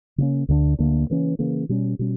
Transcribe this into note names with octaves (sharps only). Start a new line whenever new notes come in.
C#3 G3 A#3 C#4
D2 D3 A#3 D4
D2 D3 A#3 D4
C#3 E3 A#3 C#4
C#3 E3 A#3 C#4
B2 G3 C#4
B2 G3 C#4